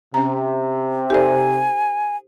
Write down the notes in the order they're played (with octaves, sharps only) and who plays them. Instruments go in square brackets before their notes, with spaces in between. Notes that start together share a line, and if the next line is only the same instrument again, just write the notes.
[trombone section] C3 [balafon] C#4 A#5
[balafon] D#4 A4 D5 [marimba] G4 C5 [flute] G#5